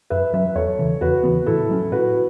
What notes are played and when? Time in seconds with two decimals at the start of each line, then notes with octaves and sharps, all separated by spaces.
0.10 F#2 B4 E5
0.33 F#3 C#4 B4 E5
0.55 E2 A4 C#5
0.79 C#3 E3
1.01 E2 F#4 B4
1.23 C#3 E3 B3
1.46 A2 E4 A4
1.69 F#3 A3 C#4
1.91 A2 F#4 B4